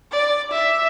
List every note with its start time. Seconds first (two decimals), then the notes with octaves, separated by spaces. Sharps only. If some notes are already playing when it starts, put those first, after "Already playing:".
0.12 D5
0.51 E5